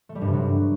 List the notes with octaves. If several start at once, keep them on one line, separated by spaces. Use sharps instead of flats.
A3
G3
G2
C3
F#3